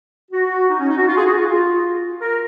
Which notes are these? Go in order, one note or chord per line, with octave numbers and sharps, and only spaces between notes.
F#4
D#4
C#4
D#4
F#4
F4
G#4
F#4
F4
A#4